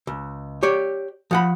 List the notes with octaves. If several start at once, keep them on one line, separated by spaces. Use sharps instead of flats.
C#2
G4 C#5 D5
F3 F#5 B5